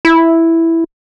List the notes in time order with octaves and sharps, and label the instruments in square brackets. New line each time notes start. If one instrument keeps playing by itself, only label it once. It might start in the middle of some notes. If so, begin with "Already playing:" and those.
[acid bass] E4